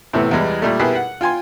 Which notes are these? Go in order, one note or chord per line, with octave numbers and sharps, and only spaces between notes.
A2 C3 E3 A3 B3
E2 E3 G3 G#3
A#2 G3 A3
B2 E4 G4 G#4 A#4 B4
F#5
F4 G5 G#5 C6